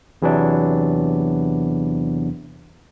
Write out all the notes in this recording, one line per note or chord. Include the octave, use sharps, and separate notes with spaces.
E2 C3 E3 F#3 B3 D4